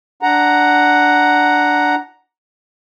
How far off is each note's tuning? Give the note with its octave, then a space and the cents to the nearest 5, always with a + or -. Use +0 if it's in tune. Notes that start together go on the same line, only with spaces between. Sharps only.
D4 +0 F#5 +0 A#5 +0